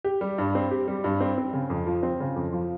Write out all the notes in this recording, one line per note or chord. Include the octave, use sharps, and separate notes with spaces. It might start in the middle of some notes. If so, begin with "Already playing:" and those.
G4
G3
G2
C4
G4
G3
G2
C4
C4
C#3
F2
F3
C4
C#3
F2
F3